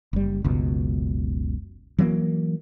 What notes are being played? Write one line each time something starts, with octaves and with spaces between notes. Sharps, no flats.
F#1 G3
F#1 C#2 B2
E3 F#3 A3 A#3